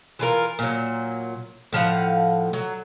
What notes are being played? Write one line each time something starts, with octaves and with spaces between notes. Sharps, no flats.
E3 F4 A#4
A#2 F#3
A2 F3 F5 F#5
F#3